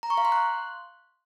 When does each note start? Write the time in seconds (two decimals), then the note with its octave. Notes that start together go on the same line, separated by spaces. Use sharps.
0.03 A#5
0.10 C#6
0.18 F5
0.25 C6
0.32 F#6